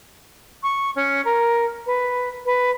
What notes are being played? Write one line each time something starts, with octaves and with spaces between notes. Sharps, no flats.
C#6
C#4
A#4
B4
B4